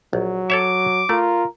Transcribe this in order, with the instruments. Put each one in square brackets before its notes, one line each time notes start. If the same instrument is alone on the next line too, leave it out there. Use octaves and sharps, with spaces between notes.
[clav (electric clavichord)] A#1 [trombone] F#3
[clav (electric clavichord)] A4 C#5 E5 [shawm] D6
[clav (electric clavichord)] A3 [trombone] F4 [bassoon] A#4